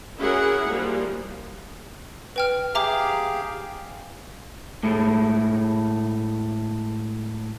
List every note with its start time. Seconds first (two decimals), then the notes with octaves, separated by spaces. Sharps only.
0.18 C#4 E4 F#4 G#4 A#4 F#5
0.67 F3 G3 A#3
2.36 B4 G5 F6
2.75 G4 G#4 E5 F5 A#5 D6
4.83 A2 G#3 A3